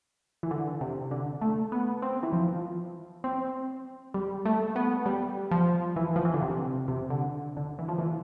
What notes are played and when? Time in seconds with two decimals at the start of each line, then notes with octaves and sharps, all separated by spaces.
0.43 E3
0.51 D3
0.81 C3
1.11 D3
1.41 A3
1.72 B3
2.02 C4
2.23 E3
2.33 F3
3.24 C4
4.14 G3
4.45 A3
4.76 B3
5.06 G3
5.51 F3
5.96 E3
6.16 F3
6.25 E3
6.34 D3
6.42 C3
6.88 C3
7.10 D3
7.57 D3
7.79 E3
7.88 F3
7.98 E3